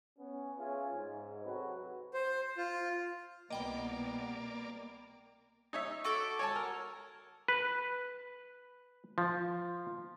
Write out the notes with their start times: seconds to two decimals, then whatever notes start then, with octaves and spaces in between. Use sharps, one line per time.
0.19 B3 C#4
0.59 C#4 F4 G#4 C#5 E5 G#5
0.94 G#2
1.44 C3 F#3 C4 F#4 A4 B4
2.14 C5
2.57 F4
3.50 C2 B2 A#3 B3 D5 D#5 G5 B5
5.73 D#4 C#5 E5
6.05 F#4 A4 D6
6.39 C#5 G#5 A5
6.56 A#4
7.48 B4
9.18 F3